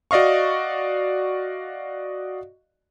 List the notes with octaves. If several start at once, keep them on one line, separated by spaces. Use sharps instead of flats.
F#4 D5 D#5 F5 C#6